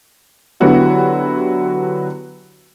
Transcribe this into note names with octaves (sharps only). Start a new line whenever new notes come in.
D3 F#3 B3 E4 F#4 G4